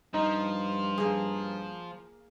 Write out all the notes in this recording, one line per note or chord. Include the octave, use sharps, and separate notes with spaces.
G2 F3 D#4
A#3 G#4